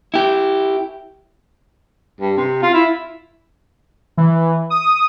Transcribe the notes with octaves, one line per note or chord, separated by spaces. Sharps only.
E4 G4
G2
C3
F4
E4
E3
D#6